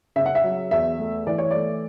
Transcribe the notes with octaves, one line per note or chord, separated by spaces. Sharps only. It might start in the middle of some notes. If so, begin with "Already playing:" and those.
C#3 E5
F#5
E5
F#3
E2 E5
A3
E3 D5
C#5
A3 D5